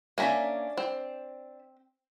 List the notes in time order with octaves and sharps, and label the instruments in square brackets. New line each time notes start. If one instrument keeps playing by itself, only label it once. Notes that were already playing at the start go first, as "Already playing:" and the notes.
[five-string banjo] A#3 C#4 A#5 [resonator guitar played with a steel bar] D4 E5 G#5
[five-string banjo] C4